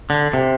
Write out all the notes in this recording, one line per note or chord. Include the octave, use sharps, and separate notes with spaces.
D3
C3